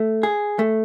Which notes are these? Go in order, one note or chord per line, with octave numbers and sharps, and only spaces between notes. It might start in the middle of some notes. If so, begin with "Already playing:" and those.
Already playing: A3
G#4
A3